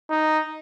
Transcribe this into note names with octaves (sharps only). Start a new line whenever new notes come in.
D#4